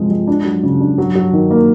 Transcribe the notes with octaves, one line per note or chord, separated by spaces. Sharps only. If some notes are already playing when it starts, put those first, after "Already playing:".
Already playing: C3 F3 G#3
G#3
D4
F#3
C#3
D4
F#3
F#3
D#3
A#3